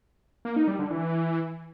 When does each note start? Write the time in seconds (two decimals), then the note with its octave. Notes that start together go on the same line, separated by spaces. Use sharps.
0.45 A#3
0.56 D#4
0.68 G3
0.79 D3
0.90 E3